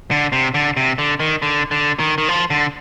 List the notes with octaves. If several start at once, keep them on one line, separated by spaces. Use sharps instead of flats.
D3
C3
D3
C3
D3
D#3
D3
D3
D#3
D#3
F3
D3